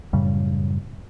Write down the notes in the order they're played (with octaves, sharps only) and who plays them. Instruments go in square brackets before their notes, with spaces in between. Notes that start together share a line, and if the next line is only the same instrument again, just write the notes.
[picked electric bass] F#2 A2 C#3 G3